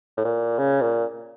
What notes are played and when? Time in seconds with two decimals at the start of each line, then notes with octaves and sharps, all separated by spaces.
0.17 A2
0.25 A#2
0.58 C#3
0.81 A#2